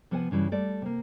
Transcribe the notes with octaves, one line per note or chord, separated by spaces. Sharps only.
C3 F3 B3 F#5 G#5
G2 C#3 E3 G3
G3 A3 D5
C3 A#3